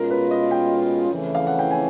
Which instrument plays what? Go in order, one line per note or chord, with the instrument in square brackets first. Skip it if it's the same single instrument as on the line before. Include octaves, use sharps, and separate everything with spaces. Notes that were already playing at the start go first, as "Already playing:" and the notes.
Already playing: [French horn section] B2 G#3 C#4 F4 [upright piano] A#4
[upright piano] B4
D#5
G5
[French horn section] F2 C#3 E3 A3 C#4
[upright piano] F5
F#5
G5
G#5